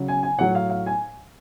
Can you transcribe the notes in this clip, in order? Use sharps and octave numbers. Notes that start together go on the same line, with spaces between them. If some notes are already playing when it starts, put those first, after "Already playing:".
Already playing: C#3 F#3
G#5
G#5
A2 F#3 F#5
F5
F5
G#5